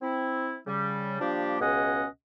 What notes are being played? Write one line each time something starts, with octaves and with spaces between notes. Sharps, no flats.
C4 E4
C#3 G3
F3 G3 A#3 D4 G4
C#2 B2 C#4 G#4 D#5 F#5